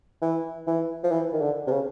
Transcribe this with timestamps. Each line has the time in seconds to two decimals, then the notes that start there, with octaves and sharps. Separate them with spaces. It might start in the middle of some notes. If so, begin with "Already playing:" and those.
0.22 E3
0.67 E3
1.04 F3
1.12 E3
1.33 D#3
1.41 D3
1.67 C3
1.71 C#3